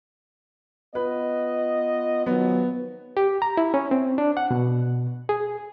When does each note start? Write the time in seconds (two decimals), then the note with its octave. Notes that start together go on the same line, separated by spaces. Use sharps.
0.95 B3 F4 B4 D#5
2.26 D#3 F3 F#3 B3
3.17 G4
3.42 A#5
3.57 E4
3.74 C#4
3.91 C4
4.18 D4
4.37 F#5
4.51 B2
5.29 G#4